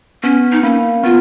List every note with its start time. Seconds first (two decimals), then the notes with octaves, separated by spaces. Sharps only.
0.23 B3 C#4
0.52 D#4
0.63 A#3 C#4
1.04 B3 F4